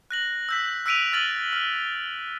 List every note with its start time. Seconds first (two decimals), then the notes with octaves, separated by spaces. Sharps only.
0.11 F#6 A#6 F#7
0.49 E6 G6 B6
0.86 E6 F#6 B6 D7 D#7 F7
1.13 E6 F6 A6 D#7 F#7
1.53 F6